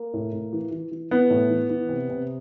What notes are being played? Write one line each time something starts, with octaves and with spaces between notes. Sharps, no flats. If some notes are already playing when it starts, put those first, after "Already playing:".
Already playing: A#3
A2
A2
E3
E3
E3
E3 B3
A2
E3
E3
C3
C3